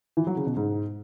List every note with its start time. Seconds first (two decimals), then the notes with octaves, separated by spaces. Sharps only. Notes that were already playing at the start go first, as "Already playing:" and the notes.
0.17 E3
0.27 F#3
0.37 C#3
0.47 B2
0.56 G#2